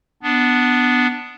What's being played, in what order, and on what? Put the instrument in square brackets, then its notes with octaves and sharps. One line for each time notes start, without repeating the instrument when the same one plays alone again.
[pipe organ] B3 D4